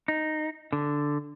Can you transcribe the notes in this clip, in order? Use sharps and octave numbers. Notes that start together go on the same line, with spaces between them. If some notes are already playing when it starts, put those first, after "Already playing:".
D#4
D3